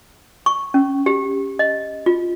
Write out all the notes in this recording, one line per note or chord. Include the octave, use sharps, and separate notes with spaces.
C#6
C#4
G4
D#5
F4